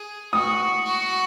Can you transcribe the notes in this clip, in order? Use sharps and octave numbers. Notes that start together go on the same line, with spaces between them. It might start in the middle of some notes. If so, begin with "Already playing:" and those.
Already playing: G#4
F#4 D#6
F#4